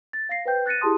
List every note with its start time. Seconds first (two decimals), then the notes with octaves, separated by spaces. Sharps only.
0.13 A6
0.29 F5 A#6 C7
0.45 B4 C5 G5 G6
0.66 F#6 A6 A#6 C#7 D#7
0.81 E4 G4 G#4 A5 C6 D#6